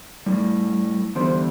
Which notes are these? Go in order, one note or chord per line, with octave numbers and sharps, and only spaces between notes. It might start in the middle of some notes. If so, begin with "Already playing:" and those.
A2 G3
E2 D3 G3 C5